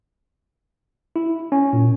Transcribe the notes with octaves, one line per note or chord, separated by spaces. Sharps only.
E4
C#4
A#2